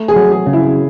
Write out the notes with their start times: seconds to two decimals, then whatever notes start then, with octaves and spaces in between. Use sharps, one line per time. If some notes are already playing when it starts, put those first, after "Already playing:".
Already playing: A3
0.08 G#4
0.16 F#3
0.32 G#4
0.47 C#3
0.53 E4